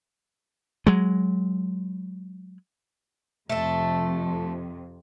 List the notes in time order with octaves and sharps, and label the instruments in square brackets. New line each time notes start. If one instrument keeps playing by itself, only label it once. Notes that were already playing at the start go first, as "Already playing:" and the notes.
[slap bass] F#3 G#3
[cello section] F2 C3 [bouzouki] A3 A4